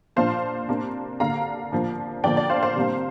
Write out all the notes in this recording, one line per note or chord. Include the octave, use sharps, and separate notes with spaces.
A#2 F3 A#3 D4 C5 F5
C3 A#3 D4
D3 A#3 D4 F5 A#5
F3 A#3 D4
D3 F3 A#3 D4 D5 G5
D5
C5 F5
C5 F5
C3 G3 A#3 D4